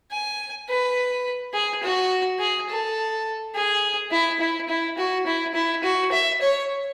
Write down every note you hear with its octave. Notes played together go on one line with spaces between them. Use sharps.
G#5
B4
G#4
F#4
G#4
A4
G#4
E4
E4
E4
F#4
E4
E4
F#4
E5
C#5